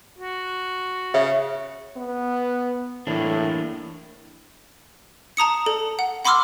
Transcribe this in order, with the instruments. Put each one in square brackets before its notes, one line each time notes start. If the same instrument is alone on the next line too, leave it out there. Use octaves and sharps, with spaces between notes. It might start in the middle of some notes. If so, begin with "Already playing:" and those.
[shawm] F#4
[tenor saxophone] C#3 [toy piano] E5
[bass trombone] B3
[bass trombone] A2 [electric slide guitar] E3 A#3 D4
[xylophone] A5 A#5 D#6 C#7
A4
F#5
F#5 B5 C6 D6 E6 F6